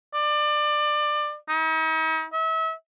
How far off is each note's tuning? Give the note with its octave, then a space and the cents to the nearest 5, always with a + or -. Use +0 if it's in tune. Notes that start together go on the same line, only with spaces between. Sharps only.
D5 +25
D#4 +45
E5 -35